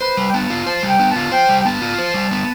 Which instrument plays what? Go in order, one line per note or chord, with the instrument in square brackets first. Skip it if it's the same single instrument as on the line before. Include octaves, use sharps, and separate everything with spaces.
[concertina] B4 [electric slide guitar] C5
[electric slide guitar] G3
[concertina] G5
[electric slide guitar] B3 [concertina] A5
[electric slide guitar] F4
[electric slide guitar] C5 [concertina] A5
[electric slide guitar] G3
[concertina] G5
[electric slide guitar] B3
[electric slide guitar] F4 [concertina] A5
[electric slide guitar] C5 [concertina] G5
[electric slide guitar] G3
[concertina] G5
[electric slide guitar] B3 [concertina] A5
[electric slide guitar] F4
C5
G3
B3